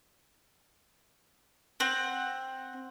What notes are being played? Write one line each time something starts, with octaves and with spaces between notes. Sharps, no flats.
C4 F#5